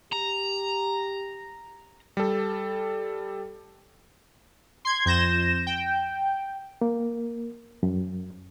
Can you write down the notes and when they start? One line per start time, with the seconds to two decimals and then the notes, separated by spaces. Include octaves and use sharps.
0.12 G4 A#5
2.17 G3 A4
4.85 C6 G#6
5.05 F2 G6 A#6 E7
5.67 G5
6.81 A#3
7.83 F#2